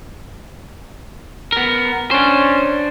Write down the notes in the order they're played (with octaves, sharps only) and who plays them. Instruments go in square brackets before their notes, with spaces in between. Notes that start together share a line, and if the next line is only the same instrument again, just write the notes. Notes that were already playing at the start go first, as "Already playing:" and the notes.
[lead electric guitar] B3 A#4
[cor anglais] C#4 [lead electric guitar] D4 C5